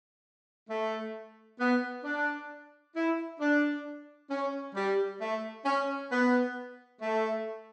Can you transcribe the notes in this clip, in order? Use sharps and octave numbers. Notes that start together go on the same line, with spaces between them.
A3
B3
D4
E4
D4
C#4
G3
A3
C#4
B3
A3